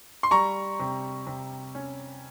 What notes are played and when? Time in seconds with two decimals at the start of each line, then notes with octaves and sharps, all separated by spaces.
0.23 C6
0.31 G3 A#5 C#6
0.80 C3
1.27 C3
1.75 C#4